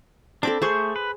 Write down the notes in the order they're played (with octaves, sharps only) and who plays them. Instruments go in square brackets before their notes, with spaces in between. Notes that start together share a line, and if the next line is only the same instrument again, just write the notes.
[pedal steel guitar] C4 D4 [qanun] A4 B5 D6
[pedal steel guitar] A3 C#6 G6 [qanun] G#4 C5
[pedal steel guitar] B4